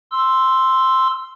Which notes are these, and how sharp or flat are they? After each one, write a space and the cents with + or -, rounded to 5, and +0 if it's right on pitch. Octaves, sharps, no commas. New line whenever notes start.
C6 +0 E6 +0